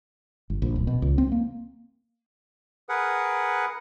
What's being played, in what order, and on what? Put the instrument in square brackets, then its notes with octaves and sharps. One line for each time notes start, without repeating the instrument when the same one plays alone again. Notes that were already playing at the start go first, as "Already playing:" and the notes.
[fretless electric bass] G1
A#1
D1
B2
C#2
C4
A#3
[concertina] G#4 A#4 B4 F#5